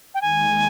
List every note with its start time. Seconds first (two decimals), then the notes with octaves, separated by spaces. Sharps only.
0.14 G5
0.21 D#2 D#3 G#3 G#5